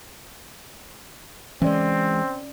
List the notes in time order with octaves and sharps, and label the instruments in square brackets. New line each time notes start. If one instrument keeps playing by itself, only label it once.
[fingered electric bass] E3 G#3 [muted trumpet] C4 [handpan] C#4 D5